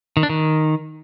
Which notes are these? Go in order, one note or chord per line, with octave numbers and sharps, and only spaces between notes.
D#3
D4
D#3